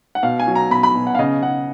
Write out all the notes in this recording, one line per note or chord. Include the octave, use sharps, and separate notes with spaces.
F#5
B2 F5
G#5
F#3
A#5
B2 B5
B5
B2
F#5
F5
C#3 D#5
C#3 F#5